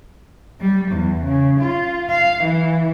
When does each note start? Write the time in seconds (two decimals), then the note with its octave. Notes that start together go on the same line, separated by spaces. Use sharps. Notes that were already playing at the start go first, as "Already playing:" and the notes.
0.59 G3
0.92 E2
1.24 C#3
1.60 F4
2.10 F5
2.44 E3